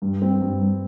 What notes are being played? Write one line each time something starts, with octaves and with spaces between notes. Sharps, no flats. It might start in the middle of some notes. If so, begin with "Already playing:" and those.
G2
C4
G2
G2